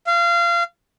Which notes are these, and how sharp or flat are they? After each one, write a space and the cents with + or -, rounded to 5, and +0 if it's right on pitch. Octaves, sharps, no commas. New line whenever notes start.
F5 -25